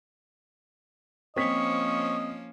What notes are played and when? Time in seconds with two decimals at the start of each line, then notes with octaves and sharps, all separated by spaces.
1.36 F3 A#3 C4 C#4 D#5 C#6 B6